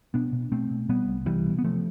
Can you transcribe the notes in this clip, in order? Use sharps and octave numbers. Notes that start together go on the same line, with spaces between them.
B2 B3 D4
B2
B2 A3 C4
B2
B2 G3 B3
C2
C2 E3 G3
B2
B3
C3 F3 A3